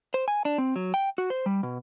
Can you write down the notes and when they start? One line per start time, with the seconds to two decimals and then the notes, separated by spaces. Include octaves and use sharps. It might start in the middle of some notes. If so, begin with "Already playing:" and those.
0.14 C5
0.28 G#5
0.45 D4
0.58 C4
0.76 F#3
0.94 G5
1.18 F#4
1.30 C5
1.46 G3
1.63 B2